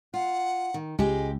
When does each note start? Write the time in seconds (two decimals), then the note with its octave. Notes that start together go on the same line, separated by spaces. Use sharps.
0.14 F4 F#5
0.74 D#3
0.99 C#2 G#3 G4 G#5